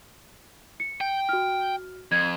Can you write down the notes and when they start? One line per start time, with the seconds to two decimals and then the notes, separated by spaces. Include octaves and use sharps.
0.80 C#7
1.01 G5
1.29 F#4 F6
2.12 F2 G#6